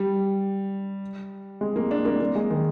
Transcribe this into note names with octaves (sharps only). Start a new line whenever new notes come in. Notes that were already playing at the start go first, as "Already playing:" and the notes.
Already playing: G3
G#3
A#3
D4
A#3
A#3
G#3
D#3